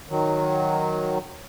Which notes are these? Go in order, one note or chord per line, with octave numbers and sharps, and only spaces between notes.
D#3 F#3